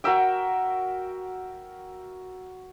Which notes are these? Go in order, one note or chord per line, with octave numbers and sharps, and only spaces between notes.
F#4 A#4 E5 G5